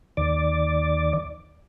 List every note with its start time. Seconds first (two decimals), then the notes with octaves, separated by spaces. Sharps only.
0.17 D#2 D5